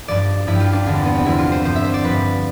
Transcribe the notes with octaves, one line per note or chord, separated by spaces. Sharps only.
G2 F3 D5
G2 F3 E4
G4
F4
D4
E2 D3 G3 D4
C4
B3
C4
E2 D3 G3 E4
F4
C5
G2 F3 C5
E5
C5
D5
G2 F3 B4